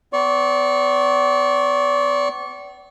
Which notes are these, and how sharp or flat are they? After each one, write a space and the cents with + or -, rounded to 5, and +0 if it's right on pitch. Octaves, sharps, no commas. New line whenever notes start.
B3 +40 D5 -35 C#6 -25